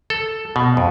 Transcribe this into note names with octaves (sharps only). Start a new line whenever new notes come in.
A4
B2
F2